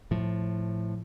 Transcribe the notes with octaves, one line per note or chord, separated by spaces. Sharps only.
A2 F3